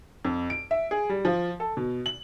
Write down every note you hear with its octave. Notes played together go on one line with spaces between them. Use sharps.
F2
D7
E5
G#4
G3
F3
A4
B2
F#7